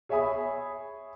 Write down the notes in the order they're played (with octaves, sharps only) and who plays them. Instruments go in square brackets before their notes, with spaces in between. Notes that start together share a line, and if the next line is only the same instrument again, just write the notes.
[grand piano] G#4 C#5 E5 G#5 B5 D#6